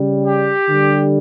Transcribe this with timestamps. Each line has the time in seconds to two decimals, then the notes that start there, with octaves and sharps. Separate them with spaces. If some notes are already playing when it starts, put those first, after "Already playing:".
Already playing: C#3 G3
0.26 G4
0.69 D3 G3